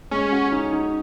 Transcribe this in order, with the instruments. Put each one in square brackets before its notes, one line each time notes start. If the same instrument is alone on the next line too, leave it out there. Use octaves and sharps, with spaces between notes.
[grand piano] G#3 [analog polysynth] C#4
[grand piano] F#4
D#4
D#4